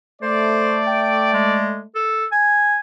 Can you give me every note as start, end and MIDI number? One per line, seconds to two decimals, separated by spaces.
0.22 1.83 57
0.22 0.81 72
0.22 1.83 74
0.87 1.33 79
1.34 1.82 56
1.95 2.25 69
2.32 2.80 80